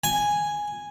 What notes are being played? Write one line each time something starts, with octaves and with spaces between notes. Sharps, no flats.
G#5